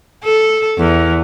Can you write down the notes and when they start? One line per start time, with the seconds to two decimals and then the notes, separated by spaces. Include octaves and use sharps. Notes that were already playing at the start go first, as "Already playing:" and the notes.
0.24 A4
0.78 E2